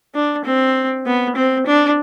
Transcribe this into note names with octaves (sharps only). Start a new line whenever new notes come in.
D4
C4
B3
C4
D4